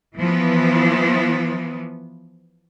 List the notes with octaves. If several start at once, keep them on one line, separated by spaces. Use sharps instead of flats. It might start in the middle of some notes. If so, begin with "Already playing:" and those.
E3 F3 B3